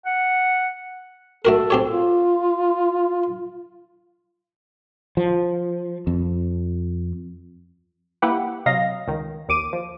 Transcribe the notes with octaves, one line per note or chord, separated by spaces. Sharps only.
F#5
A3 F#4 A4 A#4
C4 G4 C#5
F4
F3
F2
A#3 E4 G4 B4 F#5
C3 F#3 D#5 F5 A#6
C#2 D#3
D#2 D6 D#7
F3